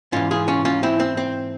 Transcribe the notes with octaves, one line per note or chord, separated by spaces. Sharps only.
G#2 E3 C#4 F4
F4 G#4
C#4 F4
C#4 F4
C4 E4
C4
C4